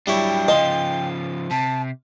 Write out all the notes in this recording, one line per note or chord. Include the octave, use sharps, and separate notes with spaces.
F#3 G3 D4 E4 C#5 G5
C#3 F3 D#5 F5 C6
C3 A5